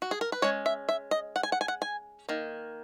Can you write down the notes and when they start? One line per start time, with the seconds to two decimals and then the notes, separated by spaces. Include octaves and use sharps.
0.02 F#4
0.11 G#4
0.21 A#4
0.32 B4
0.42 G#3 C#4 C#5
0.66 E5
0.89 E5
1.11 D#5
1.36 F#5
1.43 G#5
1.52 F#5
1.61 G#5
1.68 F#5
1.82 G#5
2.29 D#3 A#3